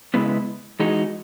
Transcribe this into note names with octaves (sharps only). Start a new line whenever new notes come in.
C#3 G#3 B3 E4 B4
E3 G#3 D#4 F#4